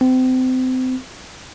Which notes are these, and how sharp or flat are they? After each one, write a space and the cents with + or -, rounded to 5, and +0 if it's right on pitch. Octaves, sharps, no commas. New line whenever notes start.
C4 -30